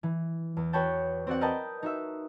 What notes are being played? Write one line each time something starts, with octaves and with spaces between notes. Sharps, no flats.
E3
E2
F#4 B4 C#5 G5 A5
C4 F#4 D5 F#5
A#4 B4 D#5 G5 A5
D#4 F#4 E5